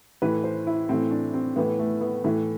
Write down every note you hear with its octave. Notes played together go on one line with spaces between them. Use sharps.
A2 E3 B4
C5
E4
A2 E3 C4
D4
C4
A2 E3 B3
A3
B3
A2 E3 A3